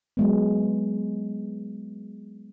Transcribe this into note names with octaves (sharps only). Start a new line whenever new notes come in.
F#3 G#3 B3